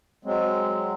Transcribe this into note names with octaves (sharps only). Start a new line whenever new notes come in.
F#3 G#3 C4